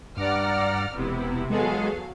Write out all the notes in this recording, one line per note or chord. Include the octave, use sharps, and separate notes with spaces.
G2 D5 F#5 A#5 D6 F6
E1 C3 B3 E4
E2 F#3 G#3 B3 G#4 A4 F5